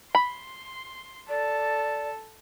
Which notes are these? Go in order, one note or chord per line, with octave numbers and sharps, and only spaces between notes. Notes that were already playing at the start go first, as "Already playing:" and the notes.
B5 C6
A4 D5